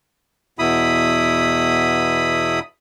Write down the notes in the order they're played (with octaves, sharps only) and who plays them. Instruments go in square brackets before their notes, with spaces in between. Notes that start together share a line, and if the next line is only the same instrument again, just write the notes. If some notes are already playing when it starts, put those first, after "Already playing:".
[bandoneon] E2 B2 E4 B5 D#6